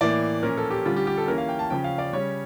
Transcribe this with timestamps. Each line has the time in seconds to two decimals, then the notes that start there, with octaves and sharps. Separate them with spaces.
0.01 A2 E3 A#3 D5
0.43 A#2 F3 C#4 A#4
0.57 A4
0.70 G4
0.85 D3 G3 C#4 F4
0.96 G4
1.07 G4
1.18 A4
1.27 E3 A#3 C#4 A#4
1.38 F5
1.48 G5
1.59 A5
1.70 C#3 F3 C#4 G5
1.84 F5
1.98 D5
2.13 C#3 G3 C#4 C#5